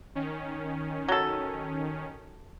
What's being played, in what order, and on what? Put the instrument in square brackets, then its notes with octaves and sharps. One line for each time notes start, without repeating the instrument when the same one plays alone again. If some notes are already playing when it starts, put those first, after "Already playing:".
[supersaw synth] D#3 C#4
[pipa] F#3 A4